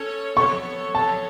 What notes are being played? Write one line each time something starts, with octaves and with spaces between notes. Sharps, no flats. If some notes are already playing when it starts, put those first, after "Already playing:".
Already playing: C#4 A4 C#5
B3 A4 C#5 C#6
B3 A4 C#5 A5